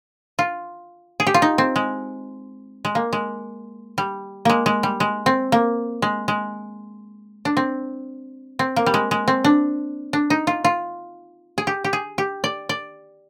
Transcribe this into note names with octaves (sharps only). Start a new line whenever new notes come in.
F4
G#4
G4
F4
D#4
C4
G#3
G#3
A#3
G#3
G3
G#3 A#3
G#3
G3
G#3
C4
A#3
G#3
G#3
D4
C4
C4
A#3
G3
G#3
G#3
C4
D4
D4
D#4
F4
F4
G#4
G4
G4
G#4
G4
D5
D5